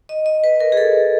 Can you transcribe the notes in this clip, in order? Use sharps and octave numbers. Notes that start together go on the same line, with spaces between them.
D#5
D#5
B4
A#4
G#4
A4